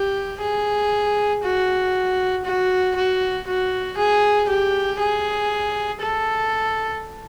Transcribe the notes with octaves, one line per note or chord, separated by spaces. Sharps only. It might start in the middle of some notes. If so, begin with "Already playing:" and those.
Already playing: G4
G#4
F#4
F#4
F#4
F#4
G#4
G4
G#4
A4